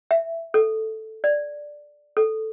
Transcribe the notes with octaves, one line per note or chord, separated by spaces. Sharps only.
E5
A4
D5
A4